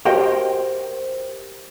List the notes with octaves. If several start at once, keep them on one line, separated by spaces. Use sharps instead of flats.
F#4 G4 A#4 C5 D#5 G5